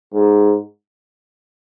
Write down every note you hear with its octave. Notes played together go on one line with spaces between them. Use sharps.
G#2